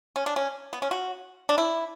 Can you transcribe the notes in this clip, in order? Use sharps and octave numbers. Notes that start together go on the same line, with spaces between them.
C#4
D4
C#4
B3
C#4
F#4
D4
E4